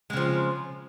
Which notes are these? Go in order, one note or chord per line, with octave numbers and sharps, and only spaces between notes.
C#3 F3 G#3